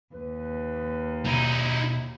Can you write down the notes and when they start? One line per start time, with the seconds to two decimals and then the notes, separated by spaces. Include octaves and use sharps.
0.14 D#2 B4
1.25 B2 D#4 E4